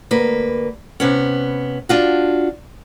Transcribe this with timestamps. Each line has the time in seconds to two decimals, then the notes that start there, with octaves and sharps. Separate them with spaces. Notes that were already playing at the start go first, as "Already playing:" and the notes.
0.11 D2 A#3 B4
1.00 C3 B3 C#4
1.89 D4 F4 F#4